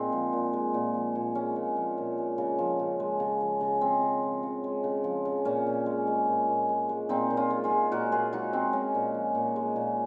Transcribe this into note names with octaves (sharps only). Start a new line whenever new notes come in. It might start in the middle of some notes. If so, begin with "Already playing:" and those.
Already playing: A#2 G#3 C4 D#4
F3
A#2
G#3
A#2
F3
A#2
G#3 C#4
A#2
F3
A#2
G#3
C#3
F3
C#3
G#3
C#3
F3
C#3
G#3 C4
C#3
F3
C#3
G#3
C#3
F3
C#3
A#2 C#4
A#2
G#3
G#3
A#2
A#2
G#3
G#3
A#2 C4 D#4
A#2
C#4 F4
G#3
F4 G#4
G#3
A#2 F#4 A#4
A#2 F4 G#4
G#3 D#4 F#4
G#3 C4 D#4
G#3 C#4
A#2
F3
A#2
G#3
A#2